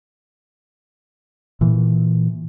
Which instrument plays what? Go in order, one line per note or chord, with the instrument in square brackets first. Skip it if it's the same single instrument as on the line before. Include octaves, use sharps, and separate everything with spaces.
[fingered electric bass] A#2 E3